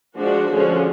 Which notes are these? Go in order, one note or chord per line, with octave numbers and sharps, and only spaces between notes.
F3 G#3 D4 F#4
D3 F3 G#3 C#4